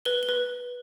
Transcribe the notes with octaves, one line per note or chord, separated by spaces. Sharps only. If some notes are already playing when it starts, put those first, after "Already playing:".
B4 G7
G7
B4